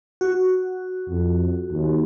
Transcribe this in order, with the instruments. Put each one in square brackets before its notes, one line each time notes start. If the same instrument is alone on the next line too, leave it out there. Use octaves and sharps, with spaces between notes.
[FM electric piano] F#4
[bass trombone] F2
D#2